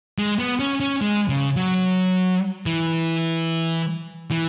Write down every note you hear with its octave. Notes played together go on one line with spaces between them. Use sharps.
G#3
B3
C#4
C#4
G#3
C#3
F#3
E3
E3